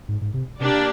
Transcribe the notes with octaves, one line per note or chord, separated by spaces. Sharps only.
G#2
G#2
C3
C3 A#3 D4 G4 D5